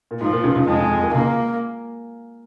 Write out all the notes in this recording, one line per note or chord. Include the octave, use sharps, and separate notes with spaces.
A#2
G#2 F3
A#2
C#2 C#3
C#2 C#3
F2 F3 G#3
F2 F3
F2 F3
D#2 D#3
C#2 C#3 A#3